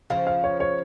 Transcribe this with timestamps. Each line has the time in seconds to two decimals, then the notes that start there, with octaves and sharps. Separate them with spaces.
0.10 C#3 F3 F5
0.27 F5
0.44 C#5
0.60 C#5